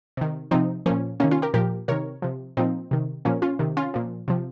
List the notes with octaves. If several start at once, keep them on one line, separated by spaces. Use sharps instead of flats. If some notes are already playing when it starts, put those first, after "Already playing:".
C3 D#3
C3 F3 C4 D#4
A#2 F3 A#3 C#4
C3 D#3 A#3 C#4
C#4 F4
G4 A#4
A#2 F3 G4 A#4
C3 D#3 A#4 C#5
C3 F3
A#2 F3 C4 D#4
C3 D#3
A#2 F3 A#3 C#4
C#4 F4
C3 D#3
C#4 F4
A#2 F3
C3 F3